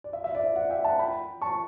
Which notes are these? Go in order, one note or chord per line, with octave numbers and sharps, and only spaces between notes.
D5
E5
E5
D5
E5
D5 F#5
E5 G5
F#5 A5
G5 B5
A5 C#6